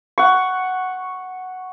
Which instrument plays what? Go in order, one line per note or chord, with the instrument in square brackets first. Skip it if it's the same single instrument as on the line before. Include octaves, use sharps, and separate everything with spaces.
[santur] F#5 C#6